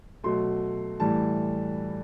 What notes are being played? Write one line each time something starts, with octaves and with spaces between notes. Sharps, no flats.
B2 F#3 A3 C6
A2 E3 G3 A5